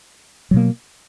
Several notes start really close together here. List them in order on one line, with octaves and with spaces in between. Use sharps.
F#3 B2 A#3